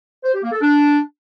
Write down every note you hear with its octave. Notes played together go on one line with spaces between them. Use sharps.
C5
G4
A#3
A4
D4